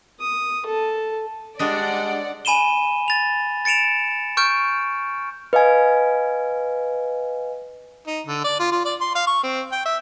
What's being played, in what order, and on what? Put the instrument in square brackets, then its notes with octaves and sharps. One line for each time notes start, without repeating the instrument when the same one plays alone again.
[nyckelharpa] D#6
A4
[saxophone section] G3 G#3 [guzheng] D4 D#5 [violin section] D5 F#5
[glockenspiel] G#5 B5 D#7 E7 G7
A6 F7
A6 C#7 D7 E7 F7
C#6 F6 G6 D7
[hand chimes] B4 D#5 F5 G#5
[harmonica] D#4
D3
D5
F4
F4
D5
C6
F5
C#6
C4
G5
E5